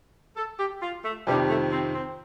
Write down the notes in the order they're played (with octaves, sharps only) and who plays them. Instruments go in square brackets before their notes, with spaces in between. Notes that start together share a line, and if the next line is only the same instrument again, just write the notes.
[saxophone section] A4
G4
F4
A3
[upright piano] F2 C3 D#3 [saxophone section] G3
[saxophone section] A3
C4
C4